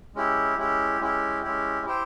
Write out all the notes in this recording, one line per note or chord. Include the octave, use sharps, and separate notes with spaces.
G#3 C#4 E4 G4
G#3 C#4 E4 G4
G#3 C#4 E4 G4
G#3 C#4 E4 G4
E4 G4 C5 G5